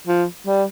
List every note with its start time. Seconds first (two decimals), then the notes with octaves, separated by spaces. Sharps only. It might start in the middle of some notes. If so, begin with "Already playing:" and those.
0.07 F3
0.46 G3